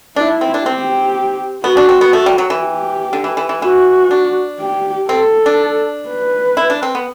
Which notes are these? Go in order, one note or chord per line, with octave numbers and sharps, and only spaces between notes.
D4 E4
C4
D4
C4 G4
B3 F#4
D4
C4
B3
A3
G3
F#3
E3
G4
D3
E3
E3
E3
E3 F#4
D4
G4
C4 A4
D4
B4
E4
D4
C4
B3